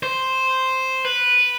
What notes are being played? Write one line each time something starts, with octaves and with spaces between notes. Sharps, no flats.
C5
B4